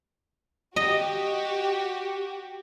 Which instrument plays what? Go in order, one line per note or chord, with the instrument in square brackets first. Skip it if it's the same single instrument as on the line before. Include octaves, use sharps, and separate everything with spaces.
[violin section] F#4 G4 [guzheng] D#5